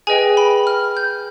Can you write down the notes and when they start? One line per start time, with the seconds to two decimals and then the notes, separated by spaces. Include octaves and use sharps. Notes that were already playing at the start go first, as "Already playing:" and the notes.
0.07 G#4 B4 D#5 G5 G#5
0.37 B5
0.67 F6
0.97 G6